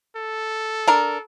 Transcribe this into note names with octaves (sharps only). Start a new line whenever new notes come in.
A4
D4 A#4